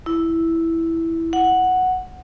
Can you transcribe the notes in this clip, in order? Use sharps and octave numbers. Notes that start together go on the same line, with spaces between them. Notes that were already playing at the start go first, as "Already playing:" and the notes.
E4
F#5